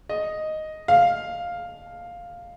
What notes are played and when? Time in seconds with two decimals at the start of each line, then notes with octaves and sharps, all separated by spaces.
0.09 D#5
0.88 F5